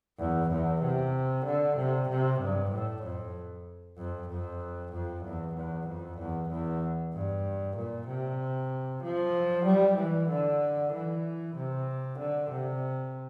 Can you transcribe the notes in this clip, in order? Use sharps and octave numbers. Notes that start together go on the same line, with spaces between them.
E2
E2
C3
D3
C3
C3
G2
A2
F2
F2
F2
F2
E2
E2
F2
E2
E2
G2
A#2
C3
F3
G3
E3
D3
E3
C3
D3
C3